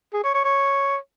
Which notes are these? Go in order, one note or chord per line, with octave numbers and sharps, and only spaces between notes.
G#4
C#5
C#5
C#5